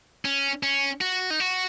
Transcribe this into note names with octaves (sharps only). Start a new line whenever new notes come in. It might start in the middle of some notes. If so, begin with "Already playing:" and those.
C#4
C#4
F#4
D#4
F#4